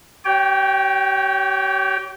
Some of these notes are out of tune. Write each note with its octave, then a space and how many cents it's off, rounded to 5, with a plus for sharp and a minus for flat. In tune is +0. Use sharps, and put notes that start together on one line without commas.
G4 -40 C#5 +15 G5 +0